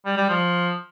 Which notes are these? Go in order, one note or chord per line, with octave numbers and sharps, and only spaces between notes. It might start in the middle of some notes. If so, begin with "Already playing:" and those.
G3
G3
F3